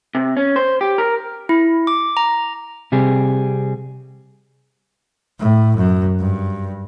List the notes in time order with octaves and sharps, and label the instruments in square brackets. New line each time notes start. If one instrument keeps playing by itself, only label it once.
[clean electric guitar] C3
C#4
C5
G4
A#4
[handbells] E4
D6
A#5
[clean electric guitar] C3 G3 C4 G#4
[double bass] A2
F#2
G2